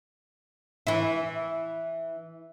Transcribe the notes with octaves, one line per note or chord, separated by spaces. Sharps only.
E3 E4